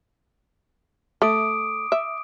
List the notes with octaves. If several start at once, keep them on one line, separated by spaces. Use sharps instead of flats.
A3 D6 D#6 D7
E5